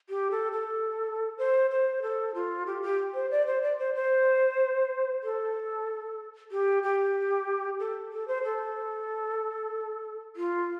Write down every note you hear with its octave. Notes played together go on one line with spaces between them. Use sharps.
G4
A4
A4
C5
C5
A4
F4
G4
G4
C5
D5
C5
D5
C5
C5
A4
G4
G4
A4
A4
C5
A4
F4